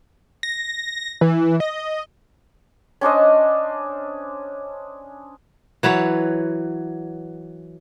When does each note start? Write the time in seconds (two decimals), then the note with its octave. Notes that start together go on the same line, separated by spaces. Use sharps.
0.43 A#6
1.21 E3
1.60 D#5
3.01 C#4 D4 C5 D#5
5.83 E3 F#3 B4 C#5